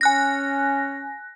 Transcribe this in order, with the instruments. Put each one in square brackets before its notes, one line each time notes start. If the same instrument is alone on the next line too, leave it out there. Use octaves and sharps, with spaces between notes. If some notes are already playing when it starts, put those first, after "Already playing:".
[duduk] C#4 [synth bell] G#5 F#6 A#6